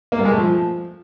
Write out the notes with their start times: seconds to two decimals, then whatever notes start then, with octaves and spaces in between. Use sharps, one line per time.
0.12 A#3
0.19 G2
0.25 G#3
0.32 A3
0.38 F3